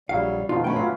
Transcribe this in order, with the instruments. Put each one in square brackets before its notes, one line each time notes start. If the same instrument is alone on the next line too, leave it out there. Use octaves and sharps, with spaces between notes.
[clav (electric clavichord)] A#1 F#3 E4 [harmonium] G3 [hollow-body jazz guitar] F5
[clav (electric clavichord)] F2 B2 D#3 [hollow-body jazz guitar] F4
[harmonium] A3 E4 [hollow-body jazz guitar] C#4 G5
[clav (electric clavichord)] E3 F#3 C#4 [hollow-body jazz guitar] F4